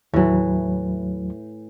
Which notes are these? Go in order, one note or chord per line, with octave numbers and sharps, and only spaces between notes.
D#2 A2 E3 F#3